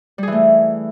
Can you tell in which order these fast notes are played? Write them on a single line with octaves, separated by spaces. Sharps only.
G3 G#4 E3 A3